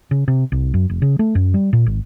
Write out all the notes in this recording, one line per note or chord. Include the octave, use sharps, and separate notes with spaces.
C#3
C3
C2
F#2
F1
C#3
A3
F#2
G3
A#2
G#1